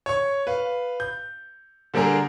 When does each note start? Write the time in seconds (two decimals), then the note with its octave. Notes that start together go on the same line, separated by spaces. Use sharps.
0.06 C#5 C#6
0.47 B4 F5
1.00 G6
1.94 D3 G3 A#3 G#4 A#4